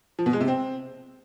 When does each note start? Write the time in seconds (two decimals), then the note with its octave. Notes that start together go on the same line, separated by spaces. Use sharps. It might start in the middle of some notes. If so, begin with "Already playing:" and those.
0.19 F3
0.26 B2
0.33 G#3
0.41 C3
0.48 C4